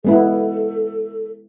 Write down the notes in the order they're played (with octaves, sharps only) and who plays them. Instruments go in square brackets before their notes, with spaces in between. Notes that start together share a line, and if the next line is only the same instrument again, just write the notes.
[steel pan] G#3 B3 E4 [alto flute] A4